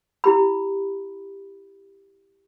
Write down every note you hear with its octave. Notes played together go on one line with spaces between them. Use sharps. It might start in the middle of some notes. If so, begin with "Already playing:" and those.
E4 G4 B5